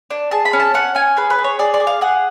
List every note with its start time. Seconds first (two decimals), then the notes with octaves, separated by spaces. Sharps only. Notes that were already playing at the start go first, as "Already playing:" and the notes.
0.10 D4
0.31 G#4 A5
0.45 B5
0.53 C#4
0.60 A5
0.74 C#4 F#5
0.95 C#4 G#5
1.17 G#4 B4
1.30 B4
1.38 G#4
1.44 C#5
1.59 G#4 D5
1.74 D5
1.80 G#4
1.87 F5
2.01 G#4 F#5